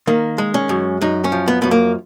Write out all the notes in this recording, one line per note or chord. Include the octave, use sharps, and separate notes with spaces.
D#3 A#3
G#3
C#4
F#2
F#2 D#4
C#4
F3
B3
F#2 B3
A#3